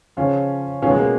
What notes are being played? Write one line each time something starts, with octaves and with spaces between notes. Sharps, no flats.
C#3 F3 C#4 F4
B2 F#3 C#4 F4
G#3
A#3